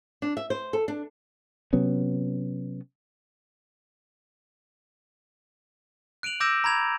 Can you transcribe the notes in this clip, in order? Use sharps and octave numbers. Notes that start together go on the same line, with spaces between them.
D4
E5
C5
A4
D4
C3 F#3 B3 C#4
F#6 D7 D#7 F7 F#7
D6 E6 G6 A#6 D7 E7
A#5 B5 G#6 F7